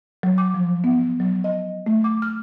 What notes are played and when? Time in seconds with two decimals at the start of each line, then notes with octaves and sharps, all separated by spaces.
0.23 F#3
0.38 D6
0.54 F3
0.84 B3
1.20 F#3
1.44 D#5
1.86 A3
2.04 D6
2.22 F6